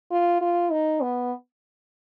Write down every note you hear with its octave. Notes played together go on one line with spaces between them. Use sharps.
F4
F4
D#4
B3